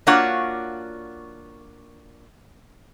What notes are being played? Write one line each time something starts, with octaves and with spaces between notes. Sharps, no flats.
A#3 D4 F4 F#4 C#5 F#5